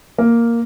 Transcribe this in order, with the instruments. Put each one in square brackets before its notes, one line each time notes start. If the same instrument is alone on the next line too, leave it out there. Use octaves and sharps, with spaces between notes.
[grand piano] A#3